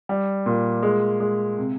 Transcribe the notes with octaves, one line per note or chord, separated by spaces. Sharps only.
G3
A#2
G#3
G#3
C3